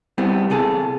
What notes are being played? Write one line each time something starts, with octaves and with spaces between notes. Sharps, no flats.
G3 B3 C4 E4
C3 G#4 A4